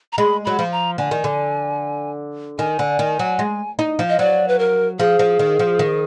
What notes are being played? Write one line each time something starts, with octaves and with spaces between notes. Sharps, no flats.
A#5
G#3 B5
F#3 B5
F3
A#5
D3 G#5
D#3
D3
D#3 G#5
D3
D#3
F#3
G#3
D#4
F3
D#5
F#3 D5
B4
A#4
F3 G#4
F3
D#3
F3
D#3